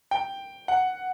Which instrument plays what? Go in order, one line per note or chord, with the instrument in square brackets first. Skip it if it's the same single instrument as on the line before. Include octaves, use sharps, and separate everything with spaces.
[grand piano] G5
F#5